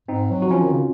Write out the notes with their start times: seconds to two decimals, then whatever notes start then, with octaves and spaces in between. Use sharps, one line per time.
0.08 G#2 C4 D#4
0.30 F#3
0.42 F#4
0.48 F#3
0.51 F3 C#4 F4
0.62 D#3
0.73 C#3